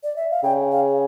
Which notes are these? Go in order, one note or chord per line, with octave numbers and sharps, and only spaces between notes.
D5
E5
F5
C#3 G5
F5